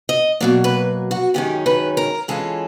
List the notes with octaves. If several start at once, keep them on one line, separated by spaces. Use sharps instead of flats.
D#5
B2 F#3 A#3 D5
B4
F#4
F#2 D#3 G#3 C#4 G4
B4
A#4
E3 G#3 C#4 F4 A4